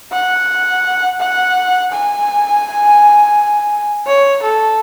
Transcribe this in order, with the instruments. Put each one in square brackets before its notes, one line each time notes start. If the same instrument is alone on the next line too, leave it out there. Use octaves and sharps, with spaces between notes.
[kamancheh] F#5
F#5
G#5
C#5
A4